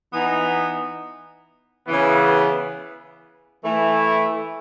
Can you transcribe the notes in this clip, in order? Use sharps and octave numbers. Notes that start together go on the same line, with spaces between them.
E3 B3 D#4
C#3 E3 B3
E3 A3 E4